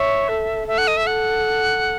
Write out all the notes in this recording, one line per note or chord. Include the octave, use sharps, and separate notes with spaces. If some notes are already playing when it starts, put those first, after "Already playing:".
Already playing: C#5 E5
A4
A4 E5
F#5
D#5
E5
A4 F#5